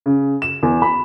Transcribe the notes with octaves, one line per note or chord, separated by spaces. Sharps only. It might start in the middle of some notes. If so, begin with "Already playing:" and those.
C#3
E7
E2
B5